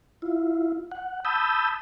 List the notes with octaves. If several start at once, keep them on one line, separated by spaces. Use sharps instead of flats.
E4 F4
F#5
A5 B5 D#6 E6 G6